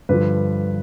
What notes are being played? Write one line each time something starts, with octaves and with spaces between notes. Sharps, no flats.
G2 D3 F3 B4